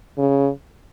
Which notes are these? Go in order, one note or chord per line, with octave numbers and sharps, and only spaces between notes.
C#3